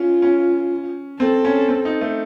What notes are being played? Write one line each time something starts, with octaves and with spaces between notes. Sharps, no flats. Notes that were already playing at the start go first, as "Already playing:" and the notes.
Already playing: C#4 F4
C#4
C4 A4
C#4
C4
D#4
A3